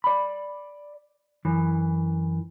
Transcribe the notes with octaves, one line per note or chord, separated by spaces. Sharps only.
D5 B5
F#2 E3